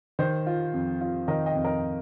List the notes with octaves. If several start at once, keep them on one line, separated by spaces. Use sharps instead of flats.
D#3 C5
F4
F2
F4
D#3 A#4 D#5
D#5 G5
F2
A#4 D#5